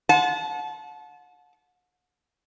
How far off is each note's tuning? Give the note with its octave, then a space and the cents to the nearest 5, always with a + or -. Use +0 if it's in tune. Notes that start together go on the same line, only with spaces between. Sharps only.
F#5 -35 A5 -25